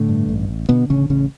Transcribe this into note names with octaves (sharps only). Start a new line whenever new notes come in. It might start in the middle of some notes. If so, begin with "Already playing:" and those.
Already playing: A2 D3 A3
G2
A1
A1
B2 D3 B3
A1 C#3 C#4
A1 C#3 C#4